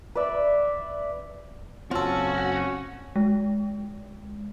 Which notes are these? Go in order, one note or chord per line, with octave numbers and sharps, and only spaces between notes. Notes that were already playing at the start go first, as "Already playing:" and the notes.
B4 D5 E5
F#1 C4 C#4 F4 F#4 A4
G#3